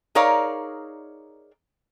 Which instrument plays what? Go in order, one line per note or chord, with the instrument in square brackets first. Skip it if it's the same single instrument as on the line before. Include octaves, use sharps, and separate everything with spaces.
[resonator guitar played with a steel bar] D#4 G#4 A#4 C#5 D5 F5